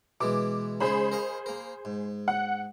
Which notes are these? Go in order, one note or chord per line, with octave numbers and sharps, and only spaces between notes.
B2 E3 G#3 D6
C#3 G#3 D#4 G#4 C5 B5
A#4 D#5 F5
A#3 A#4
G#2
F#5